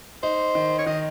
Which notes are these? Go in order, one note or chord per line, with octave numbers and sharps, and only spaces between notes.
D#4 C5
D#3
C#5
D#3 D#5